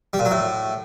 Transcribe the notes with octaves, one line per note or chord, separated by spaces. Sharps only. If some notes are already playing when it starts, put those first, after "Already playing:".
G3
A#2
F#3
A2